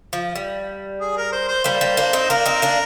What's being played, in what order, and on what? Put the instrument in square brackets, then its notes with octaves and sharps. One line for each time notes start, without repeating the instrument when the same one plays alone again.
[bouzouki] F3
G3
[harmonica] G#4
A#4
C5
C5
[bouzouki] G3 A#3 [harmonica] C5
[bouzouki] G3 A#3
A#3 D4
C4 D#4
[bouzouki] A#3 D4 [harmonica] A#4
[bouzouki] C4 D#4
A#3 D4